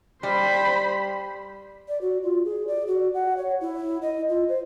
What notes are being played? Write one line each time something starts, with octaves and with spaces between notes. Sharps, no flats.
G3 C5 B5
D5
F#4
F4
G#4
D5
F#4
F#5
C#5
E4
D#5
F4
C5